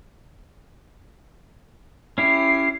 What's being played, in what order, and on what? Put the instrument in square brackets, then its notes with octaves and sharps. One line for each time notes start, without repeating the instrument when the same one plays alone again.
[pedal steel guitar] C#4 E4 G4 [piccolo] C7